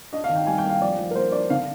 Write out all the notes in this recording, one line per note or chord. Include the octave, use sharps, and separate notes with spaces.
D4 D#5
F5
D#3
G5
G3 G#5
G5
A#3
F5
F3 D5
F3
A#4
A#3 C5
D4 D5
D3 F5